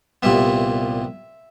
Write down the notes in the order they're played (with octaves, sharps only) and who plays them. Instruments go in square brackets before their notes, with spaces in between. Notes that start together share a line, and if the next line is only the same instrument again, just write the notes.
[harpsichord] C2 A#2 G3 B3 E5